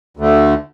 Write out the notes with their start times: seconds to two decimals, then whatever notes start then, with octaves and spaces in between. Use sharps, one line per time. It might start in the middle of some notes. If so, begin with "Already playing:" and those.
0.17 D2 D3 A3